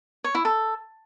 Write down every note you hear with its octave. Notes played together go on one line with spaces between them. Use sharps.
C#5
E4
A4